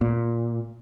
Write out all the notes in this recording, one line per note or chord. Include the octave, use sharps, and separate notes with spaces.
A#2